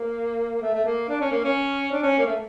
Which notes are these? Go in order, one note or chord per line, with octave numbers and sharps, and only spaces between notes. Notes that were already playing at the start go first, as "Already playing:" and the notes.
Already playing: A#3
A3
A3
A#3
D4
C#4
A#3
C#4
D4
C#4
A#3
A3